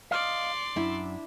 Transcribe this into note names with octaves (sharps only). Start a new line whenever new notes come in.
D5 D#5 F5 C6
F#2 D4 E4 E5